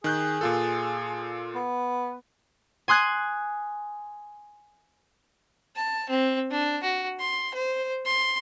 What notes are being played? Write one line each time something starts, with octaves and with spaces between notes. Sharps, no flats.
D#3 G#4 F#6 G6
A#2 F4 A4
B3
G#5 C6 D#6 F#6 G#6
A5
C4
D4
F#4
C6
C5
C6